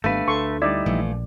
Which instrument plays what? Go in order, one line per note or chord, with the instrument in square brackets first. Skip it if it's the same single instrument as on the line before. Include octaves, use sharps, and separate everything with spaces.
[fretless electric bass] G#1 G3 B3 [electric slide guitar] A3 B4 [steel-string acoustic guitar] D4 F5
[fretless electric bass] D2 [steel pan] A4 C6 C#6
[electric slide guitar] G3 D#4 E4 [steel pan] D5
[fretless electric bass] A#1 [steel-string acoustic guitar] E3 F3 A3